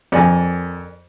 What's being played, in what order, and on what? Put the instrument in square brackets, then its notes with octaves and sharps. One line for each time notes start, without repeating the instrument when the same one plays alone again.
[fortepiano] F2 [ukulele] A#4 D5 G#5